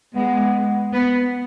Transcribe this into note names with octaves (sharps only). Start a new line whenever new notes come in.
G#3 B3
B3